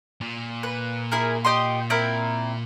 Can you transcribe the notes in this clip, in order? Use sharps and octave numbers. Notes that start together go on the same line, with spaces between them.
A#2
B4
E4 G#4 A#4
G4 D#5 C6
C4 E4 A#4